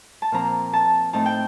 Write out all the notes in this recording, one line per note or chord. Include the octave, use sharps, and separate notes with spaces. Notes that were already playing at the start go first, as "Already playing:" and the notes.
A5
A#2 F3 C4 A#5
A5
A2 A3 C4 D#4 A5
G5